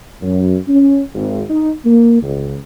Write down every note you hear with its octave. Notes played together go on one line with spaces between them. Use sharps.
F#2
C#4
G#1
D#4
A#3
C#2